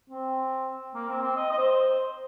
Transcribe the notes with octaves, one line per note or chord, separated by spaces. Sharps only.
C4
A#3
C4
C4
D#5
D#5
C5